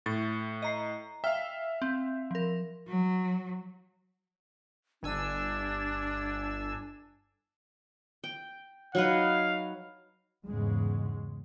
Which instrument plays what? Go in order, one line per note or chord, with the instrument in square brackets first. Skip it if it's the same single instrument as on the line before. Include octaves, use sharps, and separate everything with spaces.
[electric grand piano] A2 [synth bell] A6
[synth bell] D#5 A#5 C7
[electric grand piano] E5 F5 [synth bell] G5 F6
[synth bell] C4
F3 A#4
[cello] F#3
[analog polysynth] G1 G#5 E6 [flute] D4
[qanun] G5
[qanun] F#3 D#4 B4 [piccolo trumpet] F5
[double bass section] E2 G#2 C#3 G#3